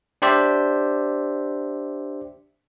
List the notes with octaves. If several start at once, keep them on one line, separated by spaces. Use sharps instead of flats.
D4 G4 C5 D5 E5